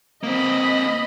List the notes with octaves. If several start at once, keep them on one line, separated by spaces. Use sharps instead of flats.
A#3 C4 D#5 B5